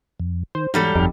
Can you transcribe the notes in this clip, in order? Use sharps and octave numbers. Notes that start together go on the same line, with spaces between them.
F2
D#3 C5
E2 G#2 F#3 G3 A4 G5 F6 G6
G1 F2 D#4 G4